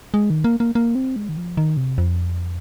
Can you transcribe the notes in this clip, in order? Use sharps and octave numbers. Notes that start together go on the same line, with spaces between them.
G#3
D#3
A#3
A#3
A#3
C4
G#3
D#3
F3
D#3
C3
F2